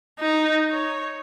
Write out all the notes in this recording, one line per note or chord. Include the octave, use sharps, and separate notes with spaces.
D#4
C#5